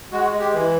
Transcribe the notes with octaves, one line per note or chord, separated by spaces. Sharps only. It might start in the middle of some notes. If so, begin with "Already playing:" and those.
G#3 F#4
G#3
G4
E3